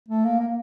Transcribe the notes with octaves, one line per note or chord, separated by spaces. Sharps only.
A3
A#3
A#3